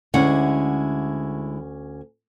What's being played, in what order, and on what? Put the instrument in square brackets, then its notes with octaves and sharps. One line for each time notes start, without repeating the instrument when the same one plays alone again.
[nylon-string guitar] D2 C#4 F#5 [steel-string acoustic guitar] D3 G#3 E4